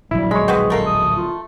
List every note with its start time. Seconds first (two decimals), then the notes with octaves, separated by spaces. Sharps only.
0.11 D1 A#1 F#3 G3 E4
0.31 G#3 C#5 B5
0.48 C4 F#4 G#4 B4
0.70 A3 A4 A#4 F5
0.86 D#6
1.17 F4